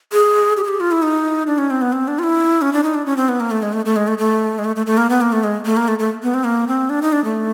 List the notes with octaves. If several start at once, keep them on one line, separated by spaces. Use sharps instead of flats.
G#4
G4
G#4
G4
F4
E4
D#4
D4
C#4
C4
B3
C4
D4
F4
E4
C#4
D4
D#4
D4
C#4
C4
B3
A#3
A3
G#3
A3
A3
G#3
A3
A3
G#3
A3
A3
A3
A#3
B3
A#3
A3
G#3
A3
A#3
A3
A3
B3
C4
A#3
C4
D4
D#4
D4
A3